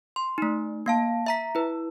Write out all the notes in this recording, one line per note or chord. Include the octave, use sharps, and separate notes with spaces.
C6
A3 D#4
A#3 F5 A5
E5 A#5 B6
E4 B4